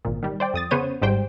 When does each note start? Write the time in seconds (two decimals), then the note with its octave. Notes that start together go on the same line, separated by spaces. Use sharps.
0.05 G#1 A#2
0.23 D#3 G3
0.40 C5 D5 G5
0.54 F2 D#6 A6
0.71 C#3 B3 C5 C#5 D#7
1.02 G#1 G#2 G3 C5 G5